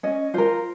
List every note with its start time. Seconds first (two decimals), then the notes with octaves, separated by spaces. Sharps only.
0.03 C#4 D#5
0.34 F4 A#4 C5